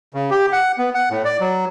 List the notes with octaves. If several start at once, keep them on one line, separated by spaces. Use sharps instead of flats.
C#3
G4
F#5
B3
F#5
A2
D5
F#3